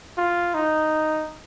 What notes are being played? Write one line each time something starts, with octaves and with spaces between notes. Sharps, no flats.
F4
D#4